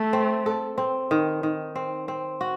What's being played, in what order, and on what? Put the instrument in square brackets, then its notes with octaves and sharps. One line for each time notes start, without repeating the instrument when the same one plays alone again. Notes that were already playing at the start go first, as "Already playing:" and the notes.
Already playing: [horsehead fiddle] A3 [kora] A4
[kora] C4
A4
C4
D#3
D#3
C4
C4
F#4